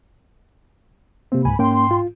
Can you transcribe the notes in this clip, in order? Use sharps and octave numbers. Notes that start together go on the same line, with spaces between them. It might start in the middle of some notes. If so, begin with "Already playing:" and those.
C3 A#3 C4
C#2 G#2 G#5 B5
G#2 A#3 C#4 G5 C6
F4